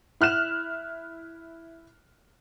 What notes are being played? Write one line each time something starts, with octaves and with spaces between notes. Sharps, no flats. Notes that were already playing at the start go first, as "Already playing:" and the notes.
E4 F6 F#6 E7